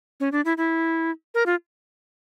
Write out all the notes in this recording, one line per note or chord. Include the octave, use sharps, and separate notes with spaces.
C#4
D4
E4
E4
A#4
F4